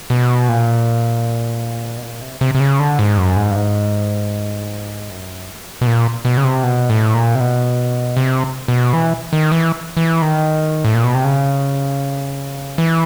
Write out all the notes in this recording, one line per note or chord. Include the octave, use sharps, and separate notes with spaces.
B2
A#2
B2
A#2
C3
C3
C3
C#3
D3
G#2
F#2
G#2
G2
G#2
F#2
B2
A#2
B2
C#3
C3
B2
A2
A#2
C3
B2
C3
B2
E3
D#3
E3
E3
D#3
A2
A#2
B2
C3
C#3
E3